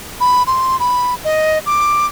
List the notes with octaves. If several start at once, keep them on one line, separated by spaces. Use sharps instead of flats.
B5
C6
B5
D#5
D6